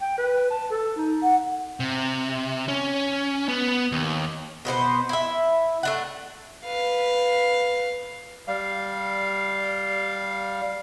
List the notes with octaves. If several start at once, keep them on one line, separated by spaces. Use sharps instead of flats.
G5
B4
A5
A4
D#4
F#5
C3
C#4
B3
D#2
B2 B3 E4 C5
E4 E5
A3 D4 F#5
B4 F5
G3 F5